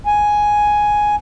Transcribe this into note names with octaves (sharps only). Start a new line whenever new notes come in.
G#5